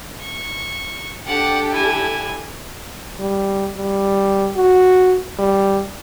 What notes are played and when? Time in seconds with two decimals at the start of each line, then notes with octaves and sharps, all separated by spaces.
0.22 C#6
1.27 D4 G4 A4 F#5 D6
1.72 E4 G#5
3.20 G3
3.78 G3
4.56 F#4
5.39 G3